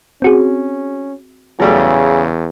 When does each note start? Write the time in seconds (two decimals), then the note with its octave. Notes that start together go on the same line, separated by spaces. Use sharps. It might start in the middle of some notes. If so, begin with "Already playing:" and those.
0.22 C4 C#4 F#4 G#4
1.60 E2 C#3 F#3 G3 A3